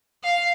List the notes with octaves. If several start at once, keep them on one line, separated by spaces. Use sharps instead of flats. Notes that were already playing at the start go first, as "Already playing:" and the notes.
F5